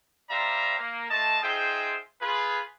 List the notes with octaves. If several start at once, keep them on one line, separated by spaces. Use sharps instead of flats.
G3 C5 D5 E5 F5 A#5
A#3
A3 F4 D#5 A5
D#4 F4 G#4 C5 E5 G5
F4 G#4 B4